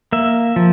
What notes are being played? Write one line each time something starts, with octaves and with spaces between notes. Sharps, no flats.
A#3 E5
F3